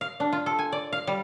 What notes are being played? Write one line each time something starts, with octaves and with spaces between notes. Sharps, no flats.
F5
D4
F4
A4
G#5
D5
F5
G3